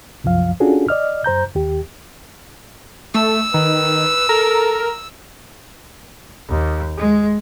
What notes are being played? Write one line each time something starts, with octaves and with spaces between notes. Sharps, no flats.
C2 F#2 F3 F5
C#4 D4 F4 F#4 G#4 A4
D5 D#5 F6
F#2 C5 A#5 G6
D#2 G4
A3 E6
D#3 B4
A4 A#4
D#2
G#3